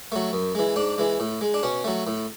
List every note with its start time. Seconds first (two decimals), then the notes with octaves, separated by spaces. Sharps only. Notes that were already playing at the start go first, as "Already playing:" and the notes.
0.12 F#3 A3
0.33 F#2
0.55 E3 G#3
0.76 G#2 D4
0.98 E3 G#3
1.20 A2
1.41 G#3
1.54 D4
1.63 B2 C#4
1.84 F#3 A3
2.07 A2